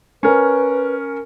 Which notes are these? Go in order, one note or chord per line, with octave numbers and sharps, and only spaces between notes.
C#4 A#4 B4